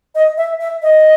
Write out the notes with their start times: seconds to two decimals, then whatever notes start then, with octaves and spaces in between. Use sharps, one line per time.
0.15 D#5
0.37 E5
0.60 E5
0.82 D#5